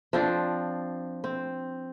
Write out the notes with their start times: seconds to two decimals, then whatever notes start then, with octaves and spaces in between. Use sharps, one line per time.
0.13 F3 C4 D4
1.24 C4